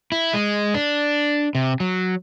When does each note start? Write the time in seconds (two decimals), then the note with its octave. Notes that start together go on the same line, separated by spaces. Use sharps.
0.12 E4
0.34 G#3
0.74 D4
1.55 C3
1.80 F#3